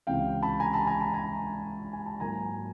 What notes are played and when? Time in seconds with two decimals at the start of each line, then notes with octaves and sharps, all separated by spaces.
0.07 C#2 C3 E3 F5 G5
0.43 A5 B5
0.60 G#5 A#5
0.73 A5 B5
0.87 G#5 A#5
1.01 A5 B5
1.14 G#5 A#5
1.93 G#5
2.06 A5
2.20 G#2 D#3 F#3 A#3 G#5 A#5